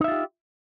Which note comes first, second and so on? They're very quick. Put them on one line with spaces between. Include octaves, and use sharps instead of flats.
D#4 E5 F4 G4